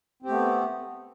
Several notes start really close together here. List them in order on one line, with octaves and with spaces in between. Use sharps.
C4 G4 A3 B3